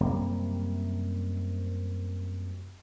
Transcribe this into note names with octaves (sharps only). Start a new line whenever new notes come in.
F#2 C3 G3 A#3